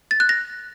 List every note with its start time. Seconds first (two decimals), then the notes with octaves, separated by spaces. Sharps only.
0.11 A6
0.20 F#6
0.29 A#6